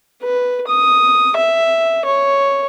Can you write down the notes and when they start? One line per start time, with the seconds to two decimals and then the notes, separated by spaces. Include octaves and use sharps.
0.22 B4
0.67 D#6
1.37 E5
2.05 C#5